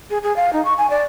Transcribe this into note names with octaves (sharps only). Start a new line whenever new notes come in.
G#4
G#4
F5
D#4
C#6
G#5
D5